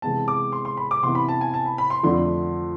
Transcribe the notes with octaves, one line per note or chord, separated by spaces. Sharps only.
C3 E3 G#3 B3 A5
D6
C6
C6
B5
D6
C3 E3 B3 E4 C6
B5
A5
G#5
A5
B5
B5
C6
F2 D3 F3 A3 D4 C6